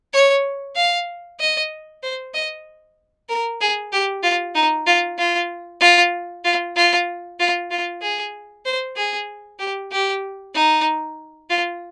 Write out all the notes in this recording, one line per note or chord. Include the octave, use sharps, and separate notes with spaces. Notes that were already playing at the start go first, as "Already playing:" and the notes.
C#5
F5
D#5
C5
D#5
A#4
G#4
G4
F4
D#4
F4
F4
F4
F4
F4
F4
F4
G#4
C5
G#4
G4
G4
D#4
F4